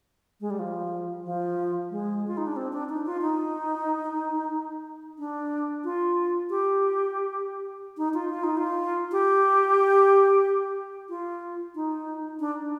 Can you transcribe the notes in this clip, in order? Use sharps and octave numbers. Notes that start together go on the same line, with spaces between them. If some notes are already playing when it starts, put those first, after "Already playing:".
G#3
G3
F3
F3
G#3
F4
D#4
D4
C4
D4
D#4
F4
D#4
D4
F4
G4
D#4
F4
F4
D#4
F4
G4
F4
D#4
D4